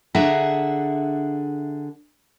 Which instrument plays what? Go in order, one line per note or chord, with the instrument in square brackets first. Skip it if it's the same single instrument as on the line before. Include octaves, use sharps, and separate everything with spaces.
[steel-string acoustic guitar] D3 D4 G#4 E5 F#5 A#5